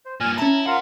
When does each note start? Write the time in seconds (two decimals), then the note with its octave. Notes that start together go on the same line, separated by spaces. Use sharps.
0.05 C5
0.20 G2 A#2 G#5 F6
0.38 C#4 E4 A5 A#5
0.67 F4 A#4 C5 F5 F#5